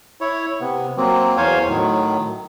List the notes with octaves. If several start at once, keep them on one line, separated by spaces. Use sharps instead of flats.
E4 C#5
C3 B3
F#3 A#3 C4
E2 C5 C#5 F5 G#5
A2 D#3 F#3